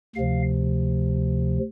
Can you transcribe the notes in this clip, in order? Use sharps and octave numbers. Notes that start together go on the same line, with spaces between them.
D2 C3 F3 F5